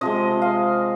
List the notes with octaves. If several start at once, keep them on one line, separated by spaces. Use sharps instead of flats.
C3 F3 G#3 D#5
F5